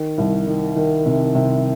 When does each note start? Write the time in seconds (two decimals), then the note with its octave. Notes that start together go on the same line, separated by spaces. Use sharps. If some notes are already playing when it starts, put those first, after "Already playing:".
Already playing: D#3
0.18 C2
0.47 D#3
0.76 D#3
1.06 C3
1.35 C3